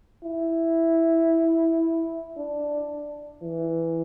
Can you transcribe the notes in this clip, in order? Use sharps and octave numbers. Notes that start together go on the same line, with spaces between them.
E4
D4
E3